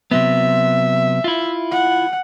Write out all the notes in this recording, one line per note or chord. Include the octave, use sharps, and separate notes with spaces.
C3 F#3 B3 E5
E4 F4
F#5